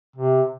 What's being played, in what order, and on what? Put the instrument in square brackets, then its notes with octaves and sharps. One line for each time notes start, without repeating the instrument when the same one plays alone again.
[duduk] C3